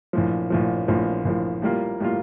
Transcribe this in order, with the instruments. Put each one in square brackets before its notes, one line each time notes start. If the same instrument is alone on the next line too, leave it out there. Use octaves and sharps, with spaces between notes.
[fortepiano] A#1 A2 F3
A#1 A2 F3
A#1 A2 F3
A#1 A2 F3
A2 G3 A#3 F4
A2 G3 A#3 F4